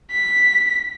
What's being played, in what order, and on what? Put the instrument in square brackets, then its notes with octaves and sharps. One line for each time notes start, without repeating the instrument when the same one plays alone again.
[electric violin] B6